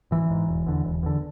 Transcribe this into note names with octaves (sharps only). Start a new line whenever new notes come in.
G#1 E3
G#2
E1
E2 D3
E1
E2 D3